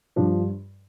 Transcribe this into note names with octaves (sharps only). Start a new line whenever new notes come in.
G2 F3 D4